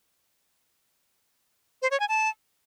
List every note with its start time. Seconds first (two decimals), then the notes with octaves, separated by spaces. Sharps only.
1.82 C5
1.91 C#5
2.00 G#5
2.09 A5